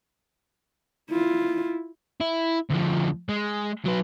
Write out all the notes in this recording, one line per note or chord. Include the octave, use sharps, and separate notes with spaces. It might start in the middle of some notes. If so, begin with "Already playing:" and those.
E4 F4
E4
D2 F3
G#3
F#3 B4